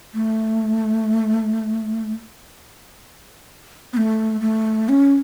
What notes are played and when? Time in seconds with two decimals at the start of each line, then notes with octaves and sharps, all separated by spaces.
0.14 A3
3.93 B3
3.97 A3
4.41 A3
4.89 C#4